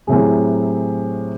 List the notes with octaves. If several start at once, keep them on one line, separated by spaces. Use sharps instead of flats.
A2 C3 F#3 G#4